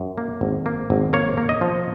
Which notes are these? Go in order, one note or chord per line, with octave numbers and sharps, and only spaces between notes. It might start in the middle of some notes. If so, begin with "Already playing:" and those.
Already playing: F#2
A#3
G#1
A#3
G#1
A#3 C#5
A#3
D#5
F3